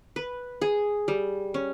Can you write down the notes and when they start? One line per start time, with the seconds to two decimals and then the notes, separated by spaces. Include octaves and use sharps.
0.16 B4
0.61 G#4
1.08 G3
1.54 C#4